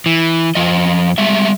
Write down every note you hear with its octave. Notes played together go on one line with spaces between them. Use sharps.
E3
F2 F3 D#5
G3 G#3 E5